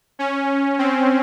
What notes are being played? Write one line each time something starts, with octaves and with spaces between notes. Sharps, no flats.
C#4
C4